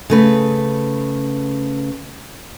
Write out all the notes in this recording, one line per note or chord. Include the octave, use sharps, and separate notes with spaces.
C#3 A3 B4